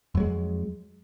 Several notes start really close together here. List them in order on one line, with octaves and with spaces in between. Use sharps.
F2 F#3 G#3